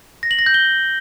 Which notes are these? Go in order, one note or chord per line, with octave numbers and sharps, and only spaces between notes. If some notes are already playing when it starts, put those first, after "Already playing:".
A#6
F#7
A#6
G6
G7